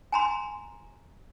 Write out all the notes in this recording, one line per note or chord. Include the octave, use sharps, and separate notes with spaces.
G#5 A#5 C6